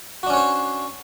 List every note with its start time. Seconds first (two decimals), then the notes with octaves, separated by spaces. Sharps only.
0.23 F#4
0.27 D4
0.30 C#4
0.33 C#5
0.37 C5